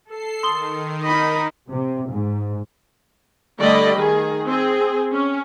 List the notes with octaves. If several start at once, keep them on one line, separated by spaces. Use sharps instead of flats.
A4 C7
D#3 C6 D#6 G7
D#4 A#4 D#5 B5
C3
G#2
D3 G3 A3 D5 D#5 B5
D#3 G#4
C4 G#4
C#4